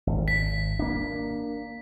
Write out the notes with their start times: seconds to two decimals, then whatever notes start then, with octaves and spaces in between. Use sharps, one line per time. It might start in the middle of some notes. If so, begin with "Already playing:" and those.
0.07 G#1
0.28 B6
0.79 A#3 D4